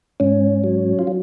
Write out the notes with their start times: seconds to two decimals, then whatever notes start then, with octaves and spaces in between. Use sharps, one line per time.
0.20 G#2 C#4
0.64 F#3
0.99 F4
1.07 F#3